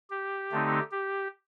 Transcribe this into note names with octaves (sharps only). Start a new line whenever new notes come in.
G4
D3 A3 C4 D#4
G4